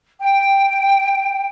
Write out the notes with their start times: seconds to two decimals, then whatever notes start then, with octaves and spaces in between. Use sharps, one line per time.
0.22 G5